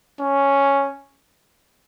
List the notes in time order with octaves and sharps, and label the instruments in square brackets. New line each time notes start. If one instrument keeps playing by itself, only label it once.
[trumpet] C#4